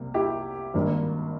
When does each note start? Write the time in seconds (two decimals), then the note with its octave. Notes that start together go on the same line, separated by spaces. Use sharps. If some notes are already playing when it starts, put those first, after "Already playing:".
Already playing: C2 C3 G3 A#3
0.14 E4 G4
0.74 G#1 G2 G3 A#3